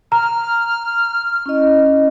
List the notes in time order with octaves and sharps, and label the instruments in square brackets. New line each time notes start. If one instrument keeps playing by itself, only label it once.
[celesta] A#5 [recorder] F6
[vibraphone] C#4 E4 D#5